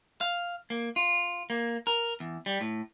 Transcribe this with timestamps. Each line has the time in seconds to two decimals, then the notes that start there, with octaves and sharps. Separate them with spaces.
0.21 F5
0.70 A#3
0.96 F4
1.50 A#3
1.87 A#4
2.20 E2
2.46 G3
2.61 A2